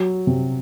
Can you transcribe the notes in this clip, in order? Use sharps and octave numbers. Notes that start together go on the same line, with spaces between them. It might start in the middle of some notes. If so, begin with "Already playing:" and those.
Already playing: F#3
C3